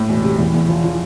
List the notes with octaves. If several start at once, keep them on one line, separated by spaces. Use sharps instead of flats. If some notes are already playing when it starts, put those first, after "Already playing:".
Already playing: A2
E1
C3
E2
E2
F3
F3